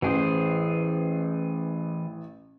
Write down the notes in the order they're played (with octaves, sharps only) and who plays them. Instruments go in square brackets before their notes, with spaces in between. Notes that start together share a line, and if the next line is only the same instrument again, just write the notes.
[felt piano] A1 [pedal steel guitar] E3 G#4 C5